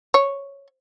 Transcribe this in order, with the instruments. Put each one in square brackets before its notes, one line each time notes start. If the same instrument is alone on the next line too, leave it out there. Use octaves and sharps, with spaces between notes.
[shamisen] C#5